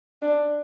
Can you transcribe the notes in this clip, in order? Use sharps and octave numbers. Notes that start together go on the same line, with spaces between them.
D4